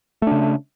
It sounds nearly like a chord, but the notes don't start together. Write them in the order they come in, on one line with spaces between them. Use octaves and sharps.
A3 D4 C#3